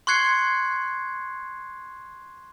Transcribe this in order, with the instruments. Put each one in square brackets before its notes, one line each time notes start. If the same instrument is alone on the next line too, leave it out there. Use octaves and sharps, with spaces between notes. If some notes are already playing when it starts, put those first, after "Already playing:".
[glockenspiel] C6 C#6 F#6 G#6 C7 C#7